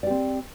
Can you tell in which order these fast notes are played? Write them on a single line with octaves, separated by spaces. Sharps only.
D5 G4 C4